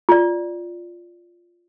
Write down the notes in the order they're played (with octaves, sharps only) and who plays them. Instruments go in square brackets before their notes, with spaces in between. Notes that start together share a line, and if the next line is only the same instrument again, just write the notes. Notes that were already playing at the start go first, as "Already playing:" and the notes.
[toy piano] F4 D5